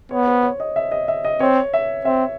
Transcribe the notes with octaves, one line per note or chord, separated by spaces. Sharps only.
B3 C#5
C5
C#5
D#5
E5
D#5
E5
D#5
C4 C#5
E5
C4 E5